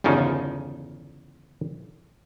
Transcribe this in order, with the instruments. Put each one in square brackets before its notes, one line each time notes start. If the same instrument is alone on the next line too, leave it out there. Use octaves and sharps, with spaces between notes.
[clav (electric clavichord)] G1 E2 C#3 F3 D#4